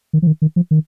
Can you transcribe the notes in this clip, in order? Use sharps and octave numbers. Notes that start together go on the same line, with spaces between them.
D#3
F3
D#3
D#3
F3
D#3